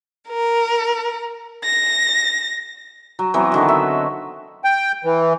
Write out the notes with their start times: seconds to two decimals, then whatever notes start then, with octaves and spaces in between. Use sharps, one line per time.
0.28 A#4
1.64 A#6
3.19 F#3
3.34 E3 F#3 B3 C4
3.52 D3 D#3 F#4
3.69 E5
4.64 G5
5.05 E3